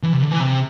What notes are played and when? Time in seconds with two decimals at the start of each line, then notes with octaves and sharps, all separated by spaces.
0.03 E3
0.13 C3
0.22 D3
0.31 E3
0.40 C3